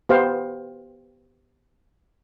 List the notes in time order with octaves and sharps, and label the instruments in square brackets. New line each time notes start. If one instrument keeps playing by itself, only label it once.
[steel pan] B3 G4 C5 F5